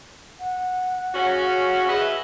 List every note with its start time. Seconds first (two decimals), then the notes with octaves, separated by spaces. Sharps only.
0.40 F#5
1.14 C#3 C#4 F#4
1.88 G#4 B4 D#5 E5